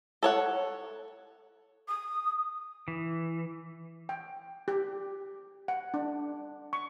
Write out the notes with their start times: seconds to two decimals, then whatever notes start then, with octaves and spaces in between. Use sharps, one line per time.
0.23 A4 C#5 F#5
1.88 D#6
2.88 E3
4.09 G5
4.68 G4
5.68 F#5
5.94 D4
6.73 C#6